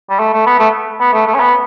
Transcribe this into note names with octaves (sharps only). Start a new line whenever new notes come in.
G3
A3
A3
B3
A3
B3
A3
A3
C#4
B3